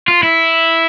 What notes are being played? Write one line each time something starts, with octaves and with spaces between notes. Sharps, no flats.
F4
E4